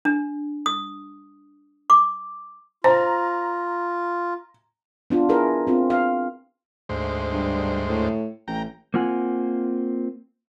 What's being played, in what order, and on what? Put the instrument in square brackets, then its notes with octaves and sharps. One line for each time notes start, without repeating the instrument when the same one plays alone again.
[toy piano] D4
D#6
D6
[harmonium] F4 [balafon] C5 [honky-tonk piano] A#5
[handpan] B3 D4 F4
E4 G#4 A#4 B4
C4 F4
F5
[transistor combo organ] D2 G#2 C5
[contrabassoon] G2
A2
[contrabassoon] A1 [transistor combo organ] G5 A#5
[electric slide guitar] A#3 C4 F4 F#5 G#5